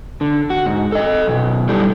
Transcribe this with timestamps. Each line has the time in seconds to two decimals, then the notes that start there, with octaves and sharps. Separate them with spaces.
0.21 D3
0.50 F#4
0.66 G#2
0.92 A4 D#5
1.27 F#2 B2
1.69 D3 G3 D4 E4 G4 A4